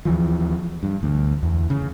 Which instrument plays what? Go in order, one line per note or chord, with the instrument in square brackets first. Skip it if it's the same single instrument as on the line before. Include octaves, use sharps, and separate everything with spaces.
[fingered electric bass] D#2 E3 F3
G2
D2
E2
C#3